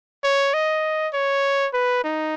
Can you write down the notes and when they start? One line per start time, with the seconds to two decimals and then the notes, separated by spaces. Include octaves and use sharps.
0.23 C#5
0.54 D#5
1.13 C#5
1.73 B4
2.04 D#4